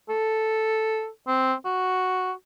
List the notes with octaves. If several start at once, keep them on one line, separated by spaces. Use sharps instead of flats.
A4
C4
F#4